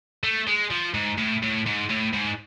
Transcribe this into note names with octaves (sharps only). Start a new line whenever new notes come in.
A3
G#3
F3
G#2
A2
A2
G#2
A2
G#2